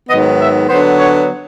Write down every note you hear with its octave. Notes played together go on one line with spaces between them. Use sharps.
G#2 D#3 F#3 B3 D#5
E5
D3 F#3 B3 C5
C#5